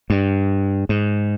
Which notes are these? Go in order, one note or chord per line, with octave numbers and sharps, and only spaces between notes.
G2
G#2